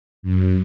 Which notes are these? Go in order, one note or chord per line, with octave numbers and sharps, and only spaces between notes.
F#2